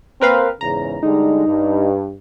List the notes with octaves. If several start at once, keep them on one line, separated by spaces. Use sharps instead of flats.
A#3 C4 A#4 B4 F5
E2 G#2 C#3 A#5
D3 G3 G#3 D#4
G2